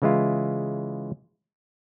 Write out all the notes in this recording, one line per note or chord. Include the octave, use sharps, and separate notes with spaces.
C#3 E3 G#3 E4 F4